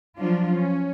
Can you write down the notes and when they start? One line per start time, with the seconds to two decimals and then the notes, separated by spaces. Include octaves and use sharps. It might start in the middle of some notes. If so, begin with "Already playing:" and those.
0.18 F3 F#3 D4 F4
0.55 C#4